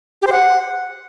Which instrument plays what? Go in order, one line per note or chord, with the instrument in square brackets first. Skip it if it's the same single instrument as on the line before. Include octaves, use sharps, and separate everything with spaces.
[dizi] G4
C5
F#5